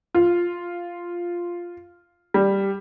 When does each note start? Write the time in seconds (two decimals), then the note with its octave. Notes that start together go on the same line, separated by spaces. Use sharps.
0.15 F4
2.34 G3